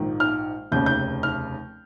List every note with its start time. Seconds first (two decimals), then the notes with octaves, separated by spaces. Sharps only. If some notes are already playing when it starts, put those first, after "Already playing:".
Already playing: A#1 G#2 D#3
0.20 F6
0.72 F1 D#2 C#3 G6
0.86 G6
1.23 F6